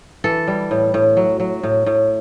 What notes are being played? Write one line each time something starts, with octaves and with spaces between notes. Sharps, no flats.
E3 A4
G3
A2
A2
F#3
F#3
A2
A2